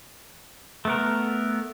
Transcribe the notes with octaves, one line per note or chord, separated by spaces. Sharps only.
A3 B3 A#4